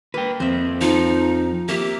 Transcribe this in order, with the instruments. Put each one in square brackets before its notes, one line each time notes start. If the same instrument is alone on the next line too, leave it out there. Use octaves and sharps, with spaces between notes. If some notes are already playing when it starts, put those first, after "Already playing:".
[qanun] A#3 [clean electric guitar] B4 G5
[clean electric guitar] F2 C4 [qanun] C5 E5
[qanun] F3 [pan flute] D#4
[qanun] A#3 E5 [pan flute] G4